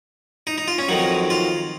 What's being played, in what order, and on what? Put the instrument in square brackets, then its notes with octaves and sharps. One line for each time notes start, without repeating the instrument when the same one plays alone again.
[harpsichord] D#4
D#4
F4
C#4
F2 D#3 F#3 D#4
F4